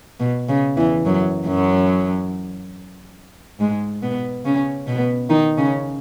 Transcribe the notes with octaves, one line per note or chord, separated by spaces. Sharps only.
B2
C#3
E2 E3
F#2 F#3
F#2 F#3
G#2 G#3
B2 B3
C#3 C#4
B2 B3
D#3 D#4
C#3 C#4